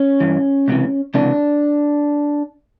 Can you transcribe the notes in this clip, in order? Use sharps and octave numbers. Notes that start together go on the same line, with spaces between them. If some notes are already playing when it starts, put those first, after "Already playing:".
Already playing: C#4
G2 E3
C#2 C3 E3
C#2 C3 E3 D4